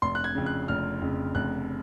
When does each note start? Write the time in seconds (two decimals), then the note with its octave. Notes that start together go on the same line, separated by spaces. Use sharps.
0.02 F1 C6
0.15 F#6
0.24 G#6
0.35 F2 C#3
0.46 F#6
0.68 F1 F6
1.02 F2 C#3
1.35 F1 F#6